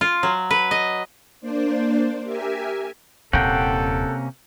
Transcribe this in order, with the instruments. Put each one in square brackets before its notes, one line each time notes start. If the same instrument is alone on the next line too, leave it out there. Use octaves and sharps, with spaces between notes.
[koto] F4
F#3
B4
D#5
[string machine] A#3 D4 C5 D5
G4 A#4 E5 G#5
[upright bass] D#1 E4 [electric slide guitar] C3 A#3 C#4 [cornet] A4 [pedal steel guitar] F#5 G5